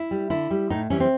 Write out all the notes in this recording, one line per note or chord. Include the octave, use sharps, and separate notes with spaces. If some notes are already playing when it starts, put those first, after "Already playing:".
Already playing: E4
G3
D3 E4
G3
A2 D#4
E3 G3 C#4
C4